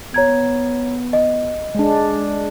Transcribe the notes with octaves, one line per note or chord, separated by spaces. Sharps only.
B3 C#5 A#5 G#6
D#5
G#3 D4